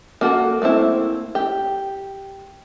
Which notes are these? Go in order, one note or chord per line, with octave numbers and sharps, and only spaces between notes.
A#3 F#4 A4
A3 A#3 C4 E4
G4